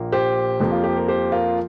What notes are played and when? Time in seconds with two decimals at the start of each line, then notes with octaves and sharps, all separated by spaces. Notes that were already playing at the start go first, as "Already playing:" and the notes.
Already playing: A#1 A#2 A#3
0.12 G4 C5
0.60 F2 F3 A#3
0.72 F4
0.84 G4
0.97 A#4
1.08 G4 C5
1.32 F4 A#4